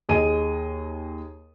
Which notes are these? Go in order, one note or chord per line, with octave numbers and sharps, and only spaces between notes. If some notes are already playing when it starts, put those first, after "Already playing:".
D#2 G#4 D#5 D#7